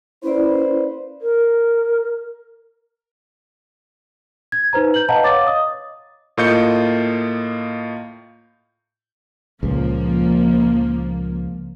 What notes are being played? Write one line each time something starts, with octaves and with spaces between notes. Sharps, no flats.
A#3 C#4 E4 B4 C5 D5
A#4
G#6
D#4 B4 C5 A#5
G6 F#7
B4 D#5 F5 F#5 A5 A#5
C#5 F5 D6 A6
D#5 D#6
A2 A#3 F4 D#5 G6 C#7
C#2 A#2 F3 A#3